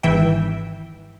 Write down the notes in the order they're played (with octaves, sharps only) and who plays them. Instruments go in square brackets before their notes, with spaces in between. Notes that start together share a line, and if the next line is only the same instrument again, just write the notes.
[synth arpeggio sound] G#1 E3 E5 G5